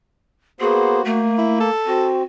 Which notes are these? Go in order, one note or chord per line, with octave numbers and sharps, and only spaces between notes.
A#3 B3 F#4 G#4 C5
A3 A#3
E4
A4
C4 F#4